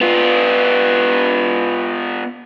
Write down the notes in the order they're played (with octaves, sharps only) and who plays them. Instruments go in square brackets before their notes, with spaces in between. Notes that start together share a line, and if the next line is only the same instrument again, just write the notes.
[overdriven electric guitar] B3 F4